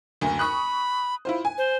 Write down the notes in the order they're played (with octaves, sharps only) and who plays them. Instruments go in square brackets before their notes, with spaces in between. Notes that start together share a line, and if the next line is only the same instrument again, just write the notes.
[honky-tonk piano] F#1 D2
[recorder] B5 [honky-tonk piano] C#6 D#6 F#6
[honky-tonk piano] E4 F4 C5
G#5
[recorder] C5